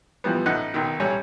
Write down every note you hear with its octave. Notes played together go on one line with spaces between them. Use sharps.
E3 F3 G3 B3
A1 D#4 F#5 F#6
B1 D#3
A1 G3 C#5 G#5